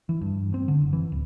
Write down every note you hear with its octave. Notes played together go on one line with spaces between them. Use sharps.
E3
G2
C4
D3
F#1
E3
D1